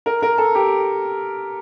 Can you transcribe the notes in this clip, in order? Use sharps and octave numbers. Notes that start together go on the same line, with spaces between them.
A#4
A#4
A4
G4